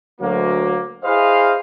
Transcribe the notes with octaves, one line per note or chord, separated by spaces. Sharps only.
D2 F#3 A#3
E4 G#4 B4 C5 D#5 F5